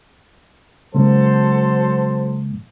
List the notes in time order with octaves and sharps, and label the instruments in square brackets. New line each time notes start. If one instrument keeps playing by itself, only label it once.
[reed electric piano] C#3 G#3 A#3 [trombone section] F#3 A4 C5